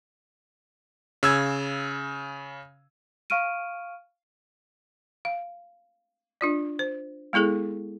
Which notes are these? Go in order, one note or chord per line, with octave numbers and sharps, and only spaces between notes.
C#3 E6 G#6
F5 C#6 F6 D7 D#7
F5
D4 F4 D5
C5
G#3 B3 E4 G#4 A4